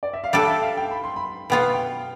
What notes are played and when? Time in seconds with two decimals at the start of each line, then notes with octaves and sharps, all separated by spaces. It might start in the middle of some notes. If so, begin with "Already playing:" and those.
0.03 D5
0.13 E5
0.24 F5
0.33 G3 D4 A4 G5
0.47 E5
0.62 F5
0.77 G5
0.91 B5
1.04 C6
1.16 B5
1.50 B2 B3 F4 G5
1.62 F5
1.74 G5